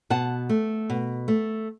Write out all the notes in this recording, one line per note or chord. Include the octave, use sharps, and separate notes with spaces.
B2 F#5 A5
A3
B2
A3